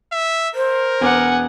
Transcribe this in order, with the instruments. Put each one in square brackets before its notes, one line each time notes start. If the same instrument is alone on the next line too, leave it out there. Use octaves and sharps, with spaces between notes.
[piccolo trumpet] E5
[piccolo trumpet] A#4 [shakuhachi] C5
[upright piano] E1 B3 D6 [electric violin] F#5 G#5